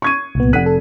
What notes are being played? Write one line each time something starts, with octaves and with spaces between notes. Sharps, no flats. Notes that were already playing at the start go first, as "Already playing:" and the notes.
C#6 G#6 D#7
C2 A#2 B3
F1 F#5 F#6 B6 D#7
A4